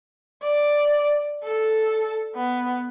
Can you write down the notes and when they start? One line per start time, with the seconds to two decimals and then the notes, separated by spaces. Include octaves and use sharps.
0.43 D5
1.44 A4
2.35 B3